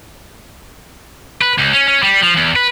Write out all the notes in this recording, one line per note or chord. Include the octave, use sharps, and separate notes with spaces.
B4
C#2
C#4
C#4
G3
F3
E2
B4